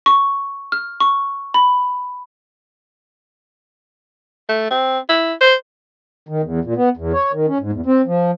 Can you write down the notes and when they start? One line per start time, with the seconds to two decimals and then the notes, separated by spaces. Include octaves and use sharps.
0.06 C#6
0.72 F6
1.00 C#6
1.54 B5
4.49 A3
4.70 C4
5.09 E4
5.41 C5
6.29 D#3
6.43 E2
6.65 A#2
6.77 B3
6.97 E2
7.13 C#5
7.33 D#3
7.48 C#4
7.60 G#2
7.73 E2
7.86 C4
8.06 F3